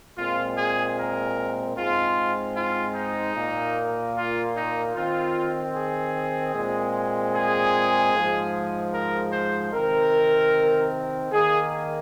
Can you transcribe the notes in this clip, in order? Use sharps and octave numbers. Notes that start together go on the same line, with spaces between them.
A#2 G#3 C4 F4
G#4
A#4
G#2 G#3 C4 F4
F4
D#4
A#2 A#3
F4
D#4
D#3 C4 F4
G#4
A#2 G#3 C4
G#4
G#2 F3 G#3
A#4
C5
C3 D#3 C4 A#4
D#3 A#3 G#4